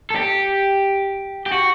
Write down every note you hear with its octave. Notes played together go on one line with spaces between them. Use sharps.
A4
G4
G4
F#4